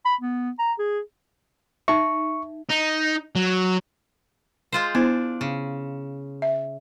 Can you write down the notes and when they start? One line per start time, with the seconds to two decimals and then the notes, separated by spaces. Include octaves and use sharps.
0.05 B5
0.21 B3
0.59 A#5
0.79 G#4
1.88 D#4 E5 C#6
2.69 D#4
3.36 F#3
4.72 G#3 F4 C5
4.95 B3 D4 E4 C5
5.41 C#3
6.42 E5